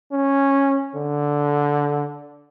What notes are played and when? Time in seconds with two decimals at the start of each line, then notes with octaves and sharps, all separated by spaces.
0.12 C#4
0.95 D3